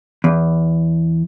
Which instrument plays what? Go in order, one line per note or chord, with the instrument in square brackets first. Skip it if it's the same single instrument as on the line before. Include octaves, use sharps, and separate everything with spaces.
[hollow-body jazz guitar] E2